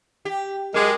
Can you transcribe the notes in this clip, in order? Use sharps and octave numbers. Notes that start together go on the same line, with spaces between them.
G4
F#2 G#3 A#4 D6